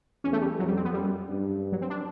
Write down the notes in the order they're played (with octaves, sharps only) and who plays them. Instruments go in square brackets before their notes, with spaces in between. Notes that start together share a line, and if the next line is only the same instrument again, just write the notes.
[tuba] E2 [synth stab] C#4
[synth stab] A3
G3
[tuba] F2 [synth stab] F#3
[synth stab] G3
C4
B3
[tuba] F#2 [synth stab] G3
[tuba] G2
[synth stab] F#3
C4
D4